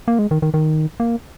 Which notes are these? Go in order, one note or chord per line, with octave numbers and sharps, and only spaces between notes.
A#3
G#3
D#3
D#3
D#3
A#3